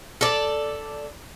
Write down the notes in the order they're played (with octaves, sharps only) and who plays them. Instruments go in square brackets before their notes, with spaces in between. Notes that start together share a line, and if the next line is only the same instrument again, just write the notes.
[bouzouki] A4 D5